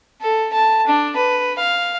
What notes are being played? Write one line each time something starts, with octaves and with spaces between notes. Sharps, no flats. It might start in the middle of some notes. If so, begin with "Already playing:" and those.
A4
A5
D4
B4
F5